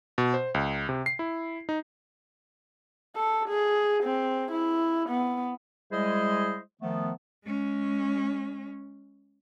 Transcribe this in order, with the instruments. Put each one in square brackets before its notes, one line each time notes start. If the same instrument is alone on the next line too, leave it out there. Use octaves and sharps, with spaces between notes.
[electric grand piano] B2
C5
C#2
C3
C7
E4
D#4
[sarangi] A4
G#4
C4
E4
B3
[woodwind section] G3 G#3 E4 G#4 C5 D#5
D#3 F3 A3 B3
[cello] G#3 C#4